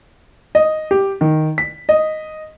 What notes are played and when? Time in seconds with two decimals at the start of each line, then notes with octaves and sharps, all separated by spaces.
0.55 D#5
0.91 G4
1.21 D#3
1.58 B6
1.89 D#5